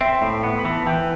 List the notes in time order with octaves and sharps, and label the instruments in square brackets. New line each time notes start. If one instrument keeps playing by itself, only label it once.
[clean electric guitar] C4 [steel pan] E5
[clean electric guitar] A2 [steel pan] E5
[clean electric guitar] B3 [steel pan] F#5
[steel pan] B5
[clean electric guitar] E3
[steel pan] A5
[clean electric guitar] E3 [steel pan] G5